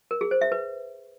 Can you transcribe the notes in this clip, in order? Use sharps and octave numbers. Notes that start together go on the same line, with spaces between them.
A#4
G#4
C5
E5
B4